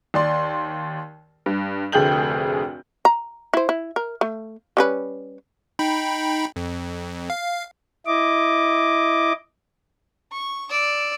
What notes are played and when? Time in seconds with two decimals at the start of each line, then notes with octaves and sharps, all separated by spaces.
0.14 D#2 D5 C6
1.46 G2
1.92 F1 D2 G#4 G5 G6 F#7
3.05 A#5
3.54 E4 C5
3.69 E4
3.96 A#4
4.21 A3
4.77 G3 C#4 B4
5.79 D#4 G5 B5
6.56 F2
7.30 F5
8.06 E4 D#5 D6
10.32 C#6
10.69 D5 E6